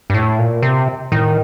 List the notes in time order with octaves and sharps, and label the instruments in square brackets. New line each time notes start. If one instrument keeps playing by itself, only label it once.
[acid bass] G2
A2
A#2
C3
[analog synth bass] A2 [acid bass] D#3